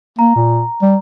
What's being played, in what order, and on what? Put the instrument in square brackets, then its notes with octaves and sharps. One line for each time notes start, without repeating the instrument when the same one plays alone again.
[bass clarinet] A#3 [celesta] A#5
[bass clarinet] A#2
G3